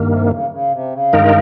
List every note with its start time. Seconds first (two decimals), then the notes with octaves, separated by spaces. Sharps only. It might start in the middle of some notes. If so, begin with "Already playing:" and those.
Already playing: G2 D#3 A#3
0.09 C3
0.30 C#3
0.50 C#3
0.71 C3
0.92 C#3
1.13 G2 D#3 G#3 D#4 A#4